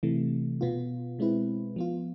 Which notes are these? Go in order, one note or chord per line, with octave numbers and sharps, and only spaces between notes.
C3 E3 A3
B2 B3 F4
B2 G#3 C4 E4 B4
F3 B3 F4